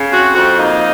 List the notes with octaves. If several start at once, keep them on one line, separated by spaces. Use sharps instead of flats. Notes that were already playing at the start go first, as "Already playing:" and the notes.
Already playing: C#3
C4 F#4
F2 F#4
A#3 D#4